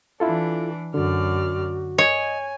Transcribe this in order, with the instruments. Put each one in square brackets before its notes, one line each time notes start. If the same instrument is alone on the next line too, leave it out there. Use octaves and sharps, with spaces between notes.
[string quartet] E3 D4 [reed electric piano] E4 F4 A4
[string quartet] F#2 D5 F6 [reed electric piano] D3 [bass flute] F#4
[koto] C#5 [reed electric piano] D#5 [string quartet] G#5